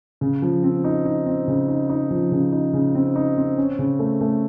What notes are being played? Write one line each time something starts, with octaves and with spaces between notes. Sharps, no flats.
C#3
F3
C4
D#4
D#4
C4
C#3
D#4
D#4
F3
C#3
D#4
C#3
C4
D#4
C4
C#4
C#3
A3
A3